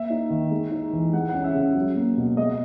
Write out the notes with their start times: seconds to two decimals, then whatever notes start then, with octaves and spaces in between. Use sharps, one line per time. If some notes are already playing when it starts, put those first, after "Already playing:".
Already playing: A#3 E5
0.10 D#4
0.30 D#3
0.51 G#3
0.71 D#4
0.93 E3
1.13 G#3 F#5
1.29 F#5
1.34 C#4
1.44 E5
1.55 C#3 F#5
1.75 F#3
1.96 A#3
2.17 B2
2.37 G#3 D#5